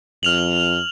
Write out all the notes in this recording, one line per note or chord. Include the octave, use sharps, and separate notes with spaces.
F2 F6 F7 F#7